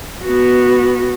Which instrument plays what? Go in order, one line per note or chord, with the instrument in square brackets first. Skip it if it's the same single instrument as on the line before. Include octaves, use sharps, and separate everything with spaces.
[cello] B3 F#4